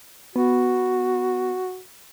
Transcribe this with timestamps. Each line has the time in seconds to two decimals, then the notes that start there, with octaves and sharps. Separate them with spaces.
0.36 B3 F#4